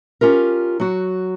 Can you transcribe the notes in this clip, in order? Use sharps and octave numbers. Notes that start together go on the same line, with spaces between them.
C#4 F4 G4 A#4
F#3 F#4